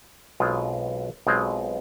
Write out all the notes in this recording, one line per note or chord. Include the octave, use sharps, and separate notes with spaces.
B1 B2 G#3 C4 F4
B1 B2 G#3 C4 F4